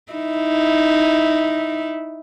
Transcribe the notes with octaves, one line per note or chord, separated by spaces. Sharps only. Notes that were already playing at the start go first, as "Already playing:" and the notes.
D#4 E4